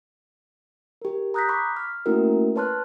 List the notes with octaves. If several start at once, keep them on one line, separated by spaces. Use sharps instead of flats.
G4 A#4
A#5 D#6 F#6 G6 A#6 B6
B5 C#6 D6 B6
F6
A3 A#3 C#4 E4 F#4 A#4
B4 C#5 A5 C6 F6 F#6